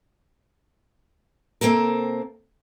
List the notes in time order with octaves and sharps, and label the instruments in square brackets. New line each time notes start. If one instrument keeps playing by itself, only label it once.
[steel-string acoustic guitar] C3 A#3 C4 A4 A#4